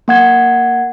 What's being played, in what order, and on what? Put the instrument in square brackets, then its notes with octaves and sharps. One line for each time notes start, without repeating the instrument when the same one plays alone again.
[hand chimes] A#3 F#5 G#6